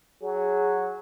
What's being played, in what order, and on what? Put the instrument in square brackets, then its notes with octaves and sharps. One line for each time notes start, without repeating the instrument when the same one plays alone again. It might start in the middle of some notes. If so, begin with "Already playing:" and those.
[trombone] F#3 [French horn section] G#4